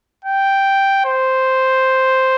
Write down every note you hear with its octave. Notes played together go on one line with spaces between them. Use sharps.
G5
C5